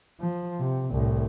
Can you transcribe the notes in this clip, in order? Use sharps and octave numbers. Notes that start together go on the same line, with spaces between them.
F3
C3
C2 A2